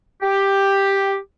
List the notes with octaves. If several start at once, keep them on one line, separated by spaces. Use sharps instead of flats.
G4